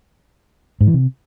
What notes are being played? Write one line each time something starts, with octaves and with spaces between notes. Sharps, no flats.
G#2
E3
C3